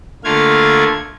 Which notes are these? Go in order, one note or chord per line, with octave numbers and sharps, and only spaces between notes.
D3 A3 A#3 F4 F5 G#6